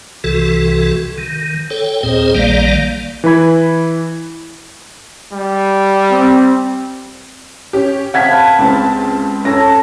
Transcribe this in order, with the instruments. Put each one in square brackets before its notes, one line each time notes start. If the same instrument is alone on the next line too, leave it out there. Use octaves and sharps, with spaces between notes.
[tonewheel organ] C2 C3 E3 F#4 A4
D#3
A4 C#5 G5
D#2 A#2 C4 G#4 C5 D#5
A#1 D#3 G3 A#3 D5 F5
[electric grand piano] E3 B4 B5 G#6
[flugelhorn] G3
[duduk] C4
[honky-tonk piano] C#4 G4
[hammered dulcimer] C3 F5 A5 [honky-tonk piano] F#5 G#6 B6
[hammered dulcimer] B4
[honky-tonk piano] C#2 C4 A5
[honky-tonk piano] F#2 C#5 A#6 [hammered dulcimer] A4